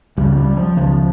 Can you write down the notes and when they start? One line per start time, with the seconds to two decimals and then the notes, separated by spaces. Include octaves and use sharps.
0.17 C#2 C#3 G3
0.37 G3
0.57 F3
0.76 C#2 C#3 F3